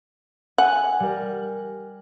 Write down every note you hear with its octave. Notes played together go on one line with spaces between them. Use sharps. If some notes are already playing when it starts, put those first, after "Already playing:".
F#5 G#5
G3 A#4